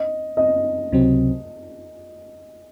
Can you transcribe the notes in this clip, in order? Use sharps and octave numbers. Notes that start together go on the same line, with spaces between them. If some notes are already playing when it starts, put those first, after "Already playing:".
Already playing: D#5
D#5
C#2 C3 F#3 C4